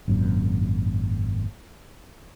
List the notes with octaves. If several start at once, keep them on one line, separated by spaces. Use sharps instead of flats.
G#1 F#2 A#2